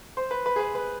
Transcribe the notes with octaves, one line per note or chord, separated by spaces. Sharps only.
C5
B4
B4
G#4
B4
B4